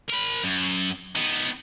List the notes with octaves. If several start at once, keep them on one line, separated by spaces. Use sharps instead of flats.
A#4 B5
F#2
D#3 B3